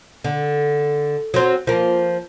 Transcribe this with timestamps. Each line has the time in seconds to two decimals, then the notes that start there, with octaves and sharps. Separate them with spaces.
0.24 D3
1.34 F#3 C4
1.67 F3 A#3